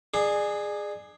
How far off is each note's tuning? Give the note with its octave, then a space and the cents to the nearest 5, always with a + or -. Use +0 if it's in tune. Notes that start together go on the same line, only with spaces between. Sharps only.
D4 +35 G#4 +0